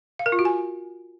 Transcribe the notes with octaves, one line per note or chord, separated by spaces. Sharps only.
F5
A#4
F4
F#4
G#5